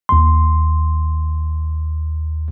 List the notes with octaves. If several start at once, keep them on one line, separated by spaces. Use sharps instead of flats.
D#2 C6